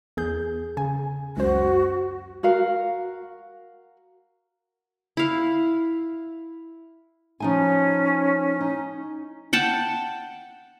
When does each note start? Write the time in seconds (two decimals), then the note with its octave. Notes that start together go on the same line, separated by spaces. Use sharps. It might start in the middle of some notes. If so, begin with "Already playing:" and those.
0.17 E2 G#4 G6
0.77 C#3 G#5
1.37 C#2 F#2 F#4 C5
2.43 F#4 A#4 F5
5.17 E4 F5
7.40 F3 C#4 D#4 G#5
8.61 D#4
9.53 F#5 G5 A5